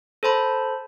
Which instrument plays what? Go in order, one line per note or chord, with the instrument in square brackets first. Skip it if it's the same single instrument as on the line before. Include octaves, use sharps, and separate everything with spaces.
[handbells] A4 C5 A5 B5